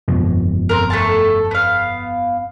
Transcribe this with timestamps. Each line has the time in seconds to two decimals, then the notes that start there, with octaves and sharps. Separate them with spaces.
0.08 G1 F2 B2
0.69 C4 A#4
0.90 A3 A4 A5
1.51 B3 F5